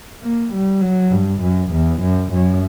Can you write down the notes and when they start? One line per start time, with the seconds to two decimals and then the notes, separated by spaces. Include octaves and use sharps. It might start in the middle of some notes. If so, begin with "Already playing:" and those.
0.22 A#3
0.53 G3
0.82 F#3
1.11 G2
1.41 F#2
1.72 E2
2.01 F#2
2.32 F#2